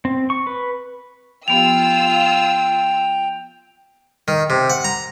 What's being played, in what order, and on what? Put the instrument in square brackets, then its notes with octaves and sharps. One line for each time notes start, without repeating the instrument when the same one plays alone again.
[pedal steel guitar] C4
C#6
B4
[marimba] F3 B3 G4 [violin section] F4 E6 [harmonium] G5 [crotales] F7
[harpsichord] D#3
C3
F#5
A#5